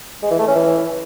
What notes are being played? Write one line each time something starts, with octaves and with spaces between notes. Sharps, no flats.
G#3
E3
A3
C#4
E3